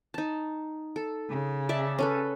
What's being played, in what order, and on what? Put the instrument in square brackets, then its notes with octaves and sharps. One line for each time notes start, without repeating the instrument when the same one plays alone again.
[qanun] D#4 A5
A4
[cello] C#3
[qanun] D5 E5 A5
C#4 A4 B4